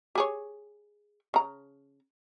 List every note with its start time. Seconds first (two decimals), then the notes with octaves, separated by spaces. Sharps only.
0.15 G4 G#4 C#5
1.34 C#3 A#5